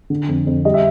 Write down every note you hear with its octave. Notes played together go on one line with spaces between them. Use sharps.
D3
F2
F2
G3 D#5
E5